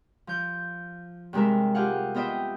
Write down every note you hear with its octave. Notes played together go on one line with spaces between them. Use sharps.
F3 G6
G2 C3 G#3 A#4 E5
F4 G4 G#4 F5 F#5
B3 F4 D#5 E5 G5